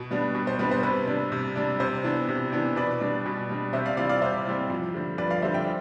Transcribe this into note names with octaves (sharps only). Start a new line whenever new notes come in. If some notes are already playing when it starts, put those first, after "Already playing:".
Already playing: B2
G3 B3 D4
B2
C5
G3 B3 D4 B4
C5
C3 B4
G3 D4
C3
G3 D4
C3 C5
E3 B3 D4
C3
E3 B3 D4
B2 B4 D5
G3 D4
B2
G3 D4
C3 C5 E5
D5 F5
E3 G3 C4 D5 F5
D5 F5
C3 C5 E5
E3 G3 C4
F2
D3 G3
F2 B4 D5
D5 F5
D3 G3 C5 E5
E5 G5